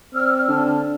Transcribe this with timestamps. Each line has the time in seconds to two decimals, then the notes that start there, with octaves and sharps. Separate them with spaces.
0.14 C4 D5 E6 F6
0.48 D3 A5